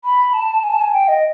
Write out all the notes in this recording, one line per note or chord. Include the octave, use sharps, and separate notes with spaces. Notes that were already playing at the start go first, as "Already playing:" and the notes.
B5
A5
G#5
A5
G#5
G5
D#5